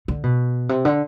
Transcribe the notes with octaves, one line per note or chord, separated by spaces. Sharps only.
D3
B2
C3
D3